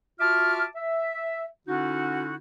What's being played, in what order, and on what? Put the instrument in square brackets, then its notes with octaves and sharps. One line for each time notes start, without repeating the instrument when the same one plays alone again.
[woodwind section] F4 F#4 E5 A5 D6 F6
E5
D3 C#4 D#4 E4 F#4